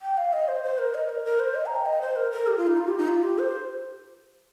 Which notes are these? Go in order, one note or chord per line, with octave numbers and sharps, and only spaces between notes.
G5
F5
D#5
C5
C5
A#4
D#5
A#4
A#4
C5
D#5
A#5
G5
D#5
C5
A#4
A#4
G4
F4
D#4
F4
G4
D#4
F4
G4
C5